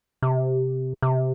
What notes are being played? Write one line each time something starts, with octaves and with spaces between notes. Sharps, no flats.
C3
C3